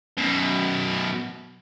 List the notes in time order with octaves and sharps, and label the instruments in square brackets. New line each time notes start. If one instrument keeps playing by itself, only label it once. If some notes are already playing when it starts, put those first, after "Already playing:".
[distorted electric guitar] F#2 B2